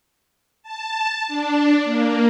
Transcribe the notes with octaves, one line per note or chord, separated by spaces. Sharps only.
A5
D4
A#3